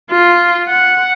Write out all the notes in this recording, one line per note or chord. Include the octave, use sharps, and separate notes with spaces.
F4
F#5